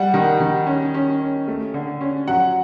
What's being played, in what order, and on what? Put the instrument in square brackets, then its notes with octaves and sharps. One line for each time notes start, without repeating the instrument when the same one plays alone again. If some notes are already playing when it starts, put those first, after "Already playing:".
Already playing: [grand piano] G3 [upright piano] F#5
[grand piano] D#3
D#3
C#4
C#4
C#4
A3
D3
C#4
[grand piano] F#3 [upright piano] F#5